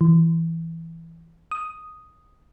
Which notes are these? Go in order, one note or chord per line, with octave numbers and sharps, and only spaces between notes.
E3
D#6